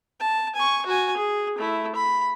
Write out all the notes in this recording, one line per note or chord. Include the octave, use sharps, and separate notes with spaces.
A5
G#5 C#6
F#4 G#5
G#4
A3 E4
B5